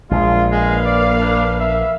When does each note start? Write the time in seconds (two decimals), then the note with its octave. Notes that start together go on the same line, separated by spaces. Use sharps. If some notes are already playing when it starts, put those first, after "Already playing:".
0.11 A#1 G#3 F4
0.52 G#3 A#3 B4 F5
0.85 D5
1.20 D4
1.60 E5